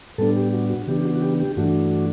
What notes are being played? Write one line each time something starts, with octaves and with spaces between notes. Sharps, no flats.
A2 G3 B3 D4 A4
G4
F#4
F#4
C#3 E3 B3 D4 G4
G4
F#4
F#4
G4
G4
G2 E3 A3 D4 F#4